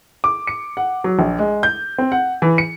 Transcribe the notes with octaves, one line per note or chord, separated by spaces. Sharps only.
D6
C#7
F#5
F#3
A#1
G#3
G6
C4
F#5
E3
C#7